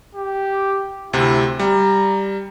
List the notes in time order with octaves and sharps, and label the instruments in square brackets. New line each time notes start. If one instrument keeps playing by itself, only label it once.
[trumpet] G4
[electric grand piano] D2 C3 [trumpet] E4
[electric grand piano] G3 [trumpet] A#5